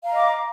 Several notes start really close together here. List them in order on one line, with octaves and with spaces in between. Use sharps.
F5 A#5 D#5 D6